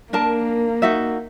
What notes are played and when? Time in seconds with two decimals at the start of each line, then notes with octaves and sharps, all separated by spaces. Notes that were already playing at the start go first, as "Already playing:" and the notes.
0.13 A#3 D4 A#4 A5
0.82 D#4 F#4 E5